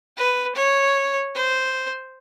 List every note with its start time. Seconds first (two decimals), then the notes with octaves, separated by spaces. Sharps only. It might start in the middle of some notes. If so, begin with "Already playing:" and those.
0.17 B4
0.55 C#5
1.35 C5